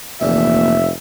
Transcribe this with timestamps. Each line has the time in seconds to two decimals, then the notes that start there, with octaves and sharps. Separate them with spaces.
0.21 F1 A#1 A#2 E3 E5